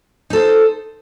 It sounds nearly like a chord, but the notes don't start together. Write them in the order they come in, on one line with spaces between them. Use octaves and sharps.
D#4 A4 C5